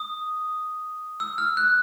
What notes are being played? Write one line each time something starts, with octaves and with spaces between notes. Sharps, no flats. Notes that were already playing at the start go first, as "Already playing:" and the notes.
Already playing: D#6
E6
F6
F#6